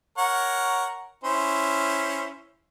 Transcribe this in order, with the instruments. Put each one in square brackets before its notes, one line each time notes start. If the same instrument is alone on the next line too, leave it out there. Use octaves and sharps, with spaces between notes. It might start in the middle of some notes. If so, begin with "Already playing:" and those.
[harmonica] A#4 C#5 F#5
C#4 E4 C5